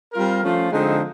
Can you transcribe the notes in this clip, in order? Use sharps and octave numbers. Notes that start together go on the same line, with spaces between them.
G3 C4 F4 A#4
F3 A3 C#4 F4
D3 F3 G#3 C4 D#4